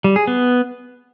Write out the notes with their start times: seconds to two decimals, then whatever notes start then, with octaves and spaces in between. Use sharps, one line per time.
0.04 G3
0.16 G#4
0.27 B3